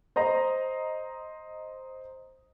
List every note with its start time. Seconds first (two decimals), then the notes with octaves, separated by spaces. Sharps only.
0.16 C5 D#5 A#5